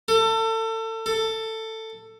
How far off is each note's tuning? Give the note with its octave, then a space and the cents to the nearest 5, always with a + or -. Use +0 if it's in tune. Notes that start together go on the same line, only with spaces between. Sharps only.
A4 +30
A4 +15